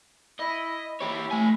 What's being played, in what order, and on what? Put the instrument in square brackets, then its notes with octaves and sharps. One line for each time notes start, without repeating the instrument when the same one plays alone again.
[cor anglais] E4 [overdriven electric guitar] D#5
[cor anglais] E4 [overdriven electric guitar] G4 C#5
[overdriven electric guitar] A3 G#5